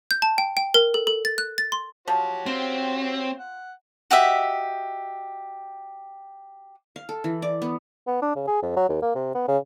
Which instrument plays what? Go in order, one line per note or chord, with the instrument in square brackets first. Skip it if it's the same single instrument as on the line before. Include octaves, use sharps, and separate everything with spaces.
[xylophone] G6
A5
G5
G5
A#4
A4
A4
A6
F#6
A6
C6
[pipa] F3 [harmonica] F#4 G4 C#5
[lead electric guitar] C4 [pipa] F4
[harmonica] F#5
[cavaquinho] F#4 G4 D#5 E5
[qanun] F5
A4
E3
D5
B3
[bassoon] B3
D4
C#3
G#4
F2
F#3
D#2
A#3
C3
B3
C#3